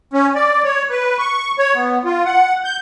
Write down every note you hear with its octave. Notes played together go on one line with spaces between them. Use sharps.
C#4
D5
C#5
B4
C#6
C#5
B3
F4
F#5
G6